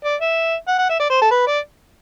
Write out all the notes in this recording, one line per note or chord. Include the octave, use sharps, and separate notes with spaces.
D5
E5
F#5
F#5
E5
D5
C5
A4
B4
D5